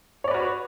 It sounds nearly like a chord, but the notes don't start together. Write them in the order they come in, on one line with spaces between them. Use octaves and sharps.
C#5 D5 B4 F#4